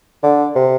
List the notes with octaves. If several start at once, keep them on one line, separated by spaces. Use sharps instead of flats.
D3
C3